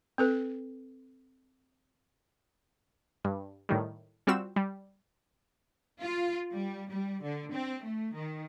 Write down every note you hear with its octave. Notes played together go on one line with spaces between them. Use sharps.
C4 A4 B4
G2
A2 D#3 G3
G3 C4 F4 F#4 E6 E7
G3
F4
G3
G3
D3
C4
A3
D#3